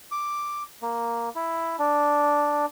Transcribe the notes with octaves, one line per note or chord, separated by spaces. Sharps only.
D6
A#3
E4
D4